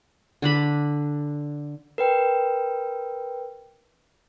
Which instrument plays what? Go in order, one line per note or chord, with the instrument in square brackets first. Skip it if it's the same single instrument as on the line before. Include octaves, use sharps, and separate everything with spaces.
[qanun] D3 D4 B5
[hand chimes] A#4 B4 G5